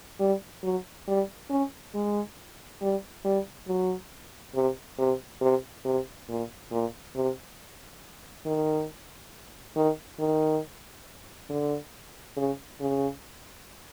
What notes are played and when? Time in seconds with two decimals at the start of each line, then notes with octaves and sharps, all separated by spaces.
0.19 G3
0.63 F#3
1.07 G3
1.50 C#4
1.94 G#3
2.81 G3
3.25 G3
3.67 F#3
4.55 C3
4.99 C3
5.41 C3
5.85 C3
6.29 A#2
6.71 A#2
7.16 C3
8.46 D#3
9.76 D#3
10.20 D#3
11.50 D3
12.37 C#3
12.81 C#3